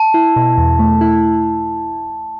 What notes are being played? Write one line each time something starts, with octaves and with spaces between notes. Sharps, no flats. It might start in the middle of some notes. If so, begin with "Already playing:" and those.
Already playing: A5
E4
B2
E2
A3
E4